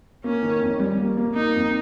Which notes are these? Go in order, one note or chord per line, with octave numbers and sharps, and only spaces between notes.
A#3 C#4
D#3
F2
G3
A#3
A#3
A#3 D#4
F2